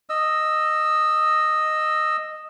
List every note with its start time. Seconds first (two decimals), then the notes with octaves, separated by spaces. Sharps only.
0.09 D#5 E6